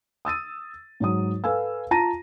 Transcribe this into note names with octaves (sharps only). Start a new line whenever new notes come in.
D#6 E6 A6 D#7
G#2 F#3 D#6
A4 B4 F5 G#5 E6
F4 A5 A#5 A#6 D#7